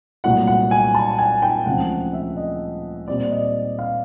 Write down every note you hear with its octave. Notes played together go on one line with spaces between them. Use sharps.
C2 A#2 F#3 A3 F#5
F#5
G#5
A5
G#5
G5
D2 C#3 F3 G#3 C4 F#5
E5
D#5
A#2 G3 C4 D5
D5
D#5
F5